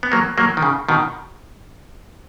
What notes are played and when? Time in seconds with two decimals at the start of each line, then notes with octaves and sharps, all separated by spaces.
0.03 B3
0.12 F#3 A#3
0.38 F#3 A#3
0.57 D#3
0.62 C#3
0.89 B2 D#3